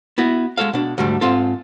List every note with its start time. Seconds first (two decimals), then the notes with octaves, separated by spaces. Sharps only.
0.18 B3 E4 F#4
0.57 G#3 F#4 A4 F5
0.73 B2 D4
0.98 D2 G#2 G3 A3
1.21 G#2 C4 F4 A4